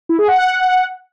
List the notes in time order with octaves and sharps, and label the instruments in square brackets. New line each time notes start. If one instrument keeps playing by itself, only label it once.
[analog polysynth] E4
G#4
F#5